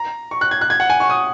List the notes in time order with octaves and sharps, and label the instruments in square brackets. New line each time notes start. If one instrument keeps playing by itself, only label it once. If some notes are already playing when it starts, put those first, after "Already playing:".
Already playing: [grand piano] A#5
C#6
F#6
G#6
F#6
G#6
F#5
G#5
C#6
D#6